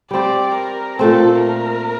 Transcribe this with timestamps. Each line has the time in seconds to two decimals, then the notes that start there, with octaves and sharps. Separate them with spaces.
0.11 G3 C4 G4 D5
0.54 A#4
0.98 A#2 A3 C4 A4
1.42 A#4